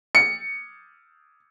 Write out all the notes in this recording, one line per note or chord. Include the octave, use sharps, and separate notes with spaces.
C#7